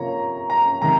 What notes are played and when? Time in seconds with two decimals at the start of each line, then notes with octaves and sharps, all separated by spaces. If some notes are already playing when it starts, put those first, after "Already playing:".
Already playing: C3 F3 A#3 C#5 A#5
0.50 A#5
0.82 C3 D#3 A#5